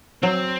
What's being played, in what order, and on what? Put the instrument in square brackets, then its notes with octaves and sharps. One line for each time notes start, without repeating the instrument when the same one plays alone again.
[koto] F#3 [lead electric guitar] C4